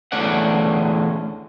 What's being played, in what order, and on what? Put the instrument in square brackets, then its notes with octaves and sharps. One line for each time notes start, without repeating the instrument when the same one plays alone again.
[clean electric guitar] E2 D3 A3 C#4 D5 F#5